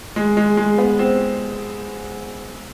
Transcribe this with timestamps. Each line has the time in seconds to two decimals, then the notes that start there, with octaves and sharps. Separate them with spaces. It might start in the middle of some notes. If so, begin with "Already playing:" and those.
0.16 G#3
0.37 G#3
0.57 G#3
0.78 B3
0.99 C4